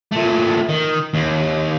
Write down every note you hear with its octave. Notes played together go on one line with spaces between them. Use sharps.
A#2 A3
D#3
D#2